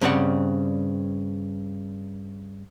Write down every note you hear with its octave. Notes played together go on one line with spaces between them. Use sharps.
G2 C#3 C4 A#4 D5 F#5